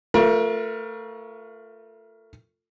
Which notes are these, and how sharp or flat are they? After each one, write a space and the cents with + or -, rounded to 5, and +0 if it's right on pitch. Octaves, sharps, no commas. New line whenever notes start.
A3 +25 F4 +0 A#4 +40